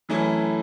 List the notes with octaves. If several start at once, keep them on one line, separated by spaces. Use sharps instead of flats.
F#2 E3 A3 C#4 E4